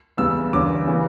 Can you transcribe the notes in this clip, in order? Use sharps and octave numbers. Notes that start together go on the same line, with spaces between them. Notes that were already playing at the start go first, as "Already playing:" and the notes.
E2 C#3 G3 B3 E6
E2 D3 G3 A#3 C#4 D6
C#3 E3 A#3